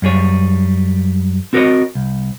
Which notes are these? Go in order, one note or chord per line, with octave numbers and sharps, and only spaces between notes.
F#2 G3 G#4 C#5
C4 F#4 A#4 B4 C#5 D#5
C2